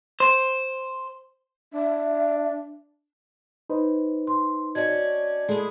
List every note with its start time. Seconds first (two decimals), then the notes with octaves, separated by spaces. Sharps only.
0.20 C5
1.74 D4 E5
3.70 D#4 B4 C5
4.27 C6
4.75 C#4 D4 F#4 D#5 G#6
5.49 G#3 E4 G#4 A4